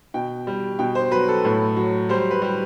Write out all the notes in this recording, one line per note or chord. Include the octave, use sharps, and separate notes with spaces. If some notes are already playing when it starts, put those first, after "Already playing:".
B2 G5
G3
B2 G5
C5
F#3 B4
A4
A2
F#3
G3 C5
B4
G3